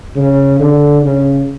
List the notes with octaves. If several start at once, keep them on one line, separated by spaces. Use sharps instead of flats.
C#3
D3
C#3